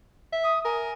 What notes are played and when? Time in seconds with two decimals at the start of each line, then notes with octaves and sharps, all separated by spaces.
0.32 E5
0.44 D#6
0.65 A#4 G#5